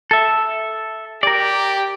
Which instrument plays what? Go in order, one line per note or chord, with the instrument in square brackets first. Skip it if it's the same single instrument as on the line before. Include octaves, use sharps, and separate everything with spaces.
[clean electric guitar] A4 E5
[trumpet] G4 [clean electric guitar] A#4 D5